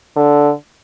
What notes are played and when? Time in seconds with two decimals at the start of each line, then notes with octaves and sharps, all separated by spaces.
0.16 D3